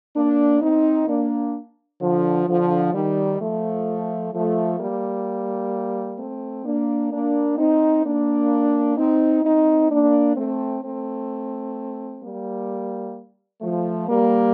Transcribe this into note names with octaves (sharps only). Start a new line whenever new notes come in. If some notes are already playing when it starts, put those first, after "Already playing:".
A#3 D4
C4 D#4
A#3 D4
D3 F3
D3 F3
D#3 G3
F3 A3
F3 A3
G3 A#3
A3 C4
A#3 D4
A#3 D4
C4 D#4
A#3 D4
C4 D#4
C4 D#4
A#3 D4
A3 C4
A3 C4
G3 A#3
F3 A3
G3 A#3